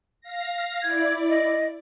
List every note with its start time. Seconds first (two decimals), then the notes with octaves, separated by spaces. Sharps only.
0.21 F5 A#6
0.82 E4 D5 G#6
1.29 D#5